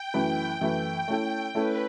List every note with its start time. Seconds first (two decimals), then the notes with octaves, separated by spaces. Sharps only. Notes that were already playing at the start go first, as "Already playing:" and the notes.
Already playing: G5
0.14 F#2 E3 A3 E4 B4
0.61 F#2 E3 A3 E4 B4 G5
1.08 A3 C#4 E4 A4
1.54 A3 C#4 E4 A4 B4